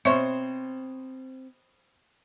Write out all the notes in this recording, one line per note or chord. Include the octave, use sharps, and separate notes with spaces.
B2 C4 C5 C#5 E5 C#6